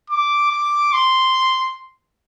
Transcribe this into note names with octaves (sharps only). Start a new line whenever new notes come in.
D6
D6
C6